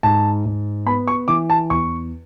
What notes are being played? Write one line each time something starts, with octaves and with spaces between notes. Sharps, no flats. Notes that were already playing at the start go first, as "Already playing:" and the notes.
G#2 A5
G#2
B3 B5
C#6
E3 D6
A5
E2 C#6